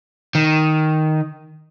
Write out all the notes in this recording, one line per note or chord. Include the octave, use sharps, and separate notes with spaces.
D#3